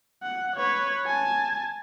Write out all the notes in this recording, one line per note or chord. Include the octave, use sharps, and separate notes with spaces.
F#5
B4 C#5
G#5 A5